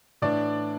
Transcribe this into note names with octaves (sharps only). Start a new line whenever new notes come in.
A2 E3 D4 D5